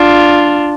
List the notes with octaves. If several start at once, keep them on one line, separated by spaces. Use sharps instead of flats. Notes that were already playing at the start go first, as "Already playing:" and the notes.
Already playing: D4 F4